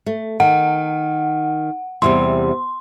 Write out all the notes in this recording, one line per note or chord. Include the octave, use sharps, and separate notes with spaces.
A3
D#3 F#5
E2 C3 G3 C6